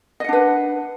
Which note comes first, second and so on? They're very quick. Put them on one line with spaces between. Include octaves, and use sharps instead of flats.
D#5 F#5 D4 B4